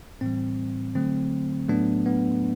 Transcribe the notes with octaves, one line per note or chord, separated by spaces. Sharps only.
A2 E3 G3 C4
D3 F#3 A3 C4
A2 F#3 A3 B3 D4
B3